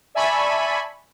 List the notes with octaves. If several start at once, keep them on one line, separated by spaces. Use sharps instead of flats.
D5 E5 G#5 A5 B5 C#6